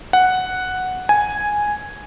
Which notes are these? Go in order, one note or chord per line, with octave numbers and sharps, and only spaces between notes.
F#5
G#5